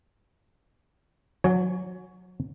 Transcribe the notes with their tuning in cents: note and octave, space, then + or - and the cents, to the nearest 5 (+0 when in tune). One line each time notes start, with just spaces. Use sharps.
F#3 -30 C#5 +20 G#5 +0